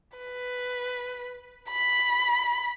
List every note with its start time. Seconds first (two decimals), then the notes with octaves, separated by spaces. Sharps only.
0.18 B4
1.70 B5